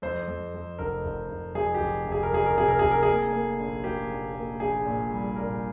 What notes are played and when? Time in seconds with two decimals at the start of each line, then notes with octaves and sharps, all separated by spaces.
0.02 F2 C5
0.28 F2
0.54 F2
0.79 F1 A#4
1.05 F1
1.29 F1
1.55 F2 G#4
1.75 G4
1.81 F1
2.06 F1
2.12 G#4
2.23 A#4
2.31 F2 G#4
2.46 A#4
2.57 C3 G#4
2.68 A#4
2.79 F1 G#4
2.91 A#4
3.03 G#4
3.08 A#3
3.33 A#3
3.59 A#1
3.84 A#3 G4
4.10 A#1
4.35 A#3
4.60 A#1 G#4
4.85 A#2
5.12 G3
5.36 A#2 A#4